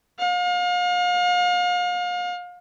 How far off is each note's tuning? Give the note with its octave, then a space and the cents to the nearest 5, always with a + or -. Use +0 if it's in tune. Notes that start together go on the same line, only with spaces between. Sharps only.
F5 +35